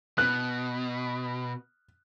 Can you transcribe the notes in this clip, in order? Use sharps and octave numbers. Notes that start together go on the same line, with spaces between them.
B2 F#6